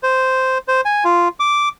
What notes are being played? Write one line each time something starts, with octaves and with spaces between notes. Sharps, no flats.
C5
C5
G#5
F4
D6